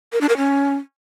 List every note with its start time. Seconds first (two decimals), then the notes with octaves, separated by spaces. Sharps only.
0.13 A#4
0.21 D4
0.29 A#4
0.37 C#4